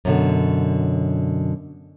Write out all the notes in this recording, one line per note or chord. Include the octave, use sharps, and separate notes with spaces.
F#2 B2 D3